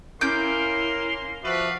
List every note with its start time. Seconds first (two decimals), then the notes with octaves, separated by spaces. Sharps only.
0.21 A#3 C#4 E4 A#4 F5 C6 D6 G6
1.44 F3 F#4 B4 D5 E5 F5